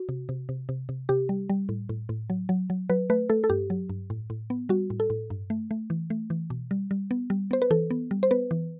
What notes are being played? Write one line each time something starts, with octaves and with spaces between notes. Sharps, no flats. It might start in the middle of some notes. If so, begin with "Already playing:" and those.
Already playing: F#4
C3
C3
C3
C3
C3
C3 G4
G3
G3
A2
A2
A2
F#3
F#3
F#3
F#3 B4
A3 B4
A3 A4
A4
G2 G4
F#3
G2
A2
A2
B3
G3 F#4
A2
A4
A2
G2
A3
A3
E3
A3
E3
B2
G3
G3
B3
G3
B3 C5
B4
E3 A4
B3
G3
C5
B3 B4
E3